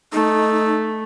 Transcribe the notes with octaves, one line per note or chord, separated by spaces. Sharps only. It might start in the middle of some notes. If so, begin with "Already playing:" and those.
A3 D#4